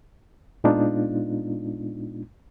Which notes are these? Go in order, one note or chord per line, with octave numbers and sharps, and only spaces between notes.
A#2 G#3 B3 D4 D#4 F4